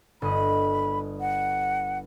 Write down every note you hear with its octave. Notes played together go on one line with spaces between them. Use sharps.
G1 D#5 B5
F#5